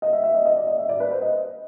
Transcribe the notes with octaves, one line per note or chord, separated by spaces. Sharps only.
D#5
E5
E5
D#5
D#5
D5
D#5
E5
D5
B4
C5
D#5